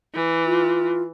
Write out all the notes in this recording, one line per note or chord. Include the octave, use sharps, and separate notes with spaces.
E3
F4